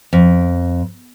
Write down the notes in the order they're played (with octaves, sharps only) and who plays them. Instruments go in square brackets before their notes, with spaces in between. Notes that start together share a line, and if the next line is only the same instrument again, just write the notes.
[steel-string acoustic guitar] F2